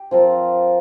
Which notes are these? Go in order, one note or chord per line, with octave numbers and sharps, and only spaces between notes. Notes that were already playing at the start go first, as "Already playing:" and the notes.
Already playing: G4
F3 C4 F4 A#4